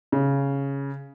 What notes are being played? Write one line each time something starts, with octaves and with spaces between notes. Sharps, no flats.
C#3